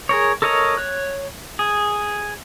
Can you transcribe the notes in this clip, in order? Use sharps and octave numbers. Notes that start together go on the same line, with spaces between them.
G#4 A#4 C#5
A4 A#4 C#5 D#5 A#5
C#5 F#6
G#4